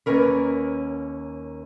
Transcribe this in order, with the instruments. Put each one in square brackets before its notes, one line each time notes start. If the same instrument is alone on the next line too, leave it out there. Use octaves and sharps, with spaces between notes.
[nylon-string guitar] D#2 A#3 C#4 A#4 B4